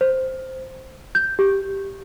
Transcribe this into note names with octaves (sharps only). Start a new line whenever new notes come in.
C5
G6
G4